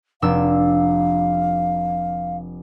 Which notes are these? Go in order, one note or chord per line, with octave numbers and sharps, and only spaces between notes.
F1 D4 F5 E6